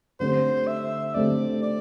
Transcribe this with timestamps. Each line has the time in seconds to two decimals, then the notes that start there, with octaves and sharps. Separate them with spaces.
0.20 D3 A3 C4 G4 C5
0.67 E5
1.15 D3 A3 C4 G4 D5
1.63 D5